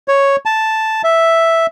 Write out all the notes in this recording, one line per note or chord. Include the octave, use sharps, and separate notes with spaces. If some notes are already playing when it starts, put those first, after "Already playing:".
C#5
A5
E5